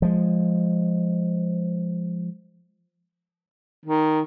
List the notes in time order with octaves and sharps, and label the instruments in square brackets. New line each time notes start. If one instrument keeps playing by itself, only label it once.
[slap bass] F3 G#3
[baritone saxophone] D#3